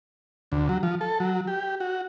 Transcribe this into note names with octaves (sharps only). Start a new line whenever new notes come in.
D2
F#3
F3
A4
F#3
G4
F#4